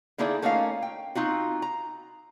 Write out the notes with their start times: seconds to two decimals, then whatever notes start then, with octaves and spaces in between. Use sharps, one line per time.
0.18 D3 A#3 D#4 E4 G#4 D5
0.42 A3 A#3 C#4 D#4 F4 F5
0.82 G5
1.15 C4 D#4 F4 F#4
1.62 A#5